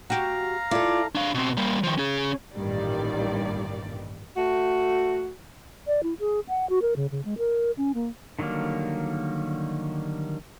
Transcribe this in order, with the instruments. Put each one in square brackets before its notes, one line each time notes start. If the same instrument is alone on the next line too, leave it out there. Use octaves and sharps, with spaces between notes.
[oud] F#4 G4 [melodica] F5 A#5
[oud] E4 A4 [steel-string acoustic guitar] F4 [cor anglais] D5
[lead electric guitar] D4 F5
B2 C4
G3 A#3
D#3 F3
C#4 G#4
[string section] A1 G2 A#2 D#3 G3 D5
[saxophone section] A3 F#4
[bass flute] D5
E4
G#4
F#5
F#4
A#4
C#3
C#3
G#3
A#4
C#4
A#3
[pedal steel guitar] D3 D#3 F#3 G3 A#3